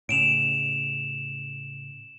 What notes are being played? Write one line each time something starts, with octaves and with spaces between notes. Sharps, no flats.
A2 C#3 D7 E7 F7